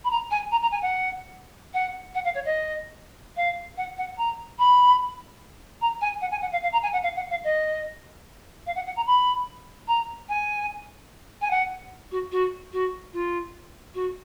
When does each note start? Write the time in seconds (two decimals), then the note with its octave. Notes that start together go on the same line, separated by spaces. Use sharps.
0.04 B5
0.10 A#5
0.31 G#5
0.51 A#5
0.62 A#5
0.71 G#5
0.82 F#5
1.73 F#5
2.14 F#5
2.24 F5
2.34 C#5
2.45 D#5
3.36 F5
3.77 F#5
3.98 F#5
4.17 A#5
4.58 B5
5.81 A#5
6.01 G#5
6.21 F#5
6.31 G#5
6.41 F#5
6.52 F5
6.62 F5
6.72 A#5
6.82 G#5
6.92 F#5
7.03 F5
7.16 F#5
7.30 F5
7.44 D#5
8.66 F5
8.75 F#5
8.86 F#5
8.96 A#5
9.06 B5
9.87 A#5
10.29 G#5
11.41 G#5
11.50 F#5
12.11 F#4
12.31 F#4
12.72 F#4
13.13 F4
13.94 F#4